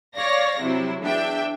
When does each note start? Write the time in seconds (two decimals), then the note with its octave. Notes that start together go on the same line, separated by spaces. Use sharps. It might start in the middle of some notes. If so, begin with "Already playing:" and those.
0.16 C#5 D5 F5 A#6
0.60 C3 F#3 E4
1.02 E2 D4 E5 G5